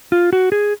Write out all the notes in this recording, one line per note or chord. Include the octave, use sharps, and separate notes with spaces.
F4
F#4
G#4